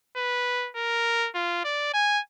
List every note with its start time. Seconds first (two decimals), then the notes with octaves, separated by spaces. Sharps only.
0.17 B4
0.76 A#4
1.35 F4
1.64 D5
1.94 G#5